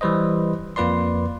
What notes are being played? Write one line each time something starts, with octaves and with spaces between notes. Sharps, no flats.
E3 G3 B4 C5 D#5
F2 A#3 F4 B4 D5 C6